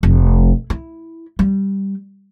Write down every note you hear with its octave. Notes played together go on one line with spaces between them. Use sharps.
F1
E4
G3